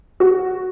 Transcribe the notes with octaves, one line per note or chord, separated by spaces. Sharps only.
F#4